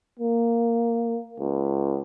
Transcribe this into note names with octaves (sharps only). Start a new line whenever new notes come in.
A#3
C#2